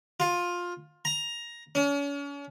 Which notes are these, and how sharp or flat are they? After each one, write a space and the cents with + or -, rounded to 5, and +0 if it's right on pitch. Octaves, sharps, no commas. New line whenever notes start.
F4 +15
A#5 +10
C#4 +40